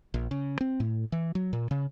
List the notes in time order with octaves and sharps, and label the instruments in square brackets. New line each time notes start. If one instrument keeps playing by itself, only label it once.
[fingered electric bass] A#1
C#3
C4
A2
E3
F#3
A#2
C#3